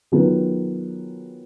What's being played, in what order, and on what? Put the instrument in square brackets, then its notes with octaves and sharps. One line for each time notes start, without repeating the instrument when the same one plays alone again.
[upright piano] D#3 F#3 B3 F4 G#4